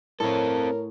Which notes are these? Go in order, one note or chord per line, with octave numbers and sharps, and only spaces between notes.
A2 C4 A4 A#4 C#5